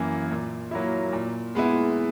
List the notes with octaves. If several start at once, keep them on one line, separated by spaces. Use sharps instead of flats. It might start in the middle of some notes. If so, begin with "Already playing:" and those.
Already playing: F#2 E3 A#3
A#2
F#3 A#3 E4
A#2
G#3 B3 E4